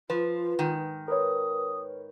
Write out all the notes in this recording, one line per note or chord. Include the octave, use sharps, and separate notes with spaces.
F3 F4 B4
G#2 D#3
A#4 B4 C#5 D#6